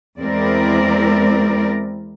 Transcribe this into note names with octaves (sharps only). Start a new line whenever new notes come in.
E2 G#3 C4 E4 A#4 D5